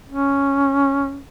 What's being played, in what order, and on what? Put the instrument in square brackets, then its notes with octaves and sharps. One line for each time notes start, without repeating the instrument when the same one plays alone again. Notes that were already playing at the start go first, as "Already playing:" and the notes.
[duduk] C#4